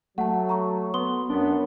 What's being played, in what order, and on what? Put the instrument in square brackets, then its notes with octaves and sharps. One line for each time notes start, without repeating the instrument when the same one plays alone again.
[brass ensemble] F#3 [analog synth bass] A3 [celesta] F#5 A5
[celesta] A#5 C#6
[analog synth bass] B3 [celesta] C6 D#6 G7
[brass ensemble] F#2 B3 [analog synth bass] D4